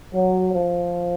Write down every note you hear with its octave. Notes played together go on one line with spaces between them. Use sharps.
F#3
F3